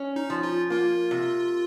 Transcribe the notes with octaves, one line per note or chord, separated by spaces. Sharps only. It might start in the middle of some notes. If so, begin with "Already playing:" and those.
Already playing: C#4
D#4
F3
F4
A#3 F4
C3